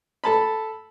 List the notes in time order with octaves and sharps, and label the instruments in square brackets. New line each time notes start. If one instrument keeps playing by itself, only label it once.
[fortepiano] A4 A5 B5